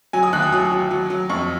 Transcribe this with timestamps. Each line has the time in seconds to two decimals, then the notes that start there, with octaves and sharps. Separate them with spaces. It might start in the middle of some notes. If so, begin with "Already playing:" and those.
0.13 F#3 G#5
0.23 D#6
0.33 D#2 F#6
0.42 D#6
0.52 F#3 D#6
0.71 F#3
0.91 F#3
1.10 F#3
1.30 F2 C#6